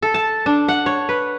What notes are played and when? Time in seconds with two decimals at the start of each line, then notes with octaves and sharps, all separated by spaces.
0.02 A4
0.14 A5
0.46 D4
0.68 F#5
0.86 C#5
1.09 B4